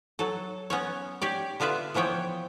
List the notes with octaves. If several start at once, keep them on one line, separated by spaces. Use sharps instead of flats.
F#3 A4
B3 C#4 C#5
G4 C#5 D5
D3 B3 F4 B4 E5
E3 F3 B3 C#5 G5